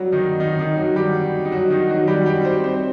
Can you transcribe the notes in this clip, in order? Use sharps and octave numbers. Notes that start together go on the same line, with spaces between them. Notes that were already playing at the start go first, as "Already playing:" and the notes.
Already playing: F#3 G3 F#4
D#3 D#4
D#3 D#4
D#3 D#4
F#3 F#4
G3 G4
D#4
F#3 F#4
D#3 D#4
F#3 F#4
G3 G4
G3 G4
C4 C5
C4 C5